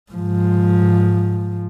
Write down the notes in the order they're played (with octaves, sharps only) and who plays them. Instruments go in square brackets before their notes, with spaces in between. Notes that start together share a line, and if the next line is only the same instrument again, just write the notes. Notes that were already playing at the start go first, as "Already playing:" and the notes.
[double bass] G#2 F3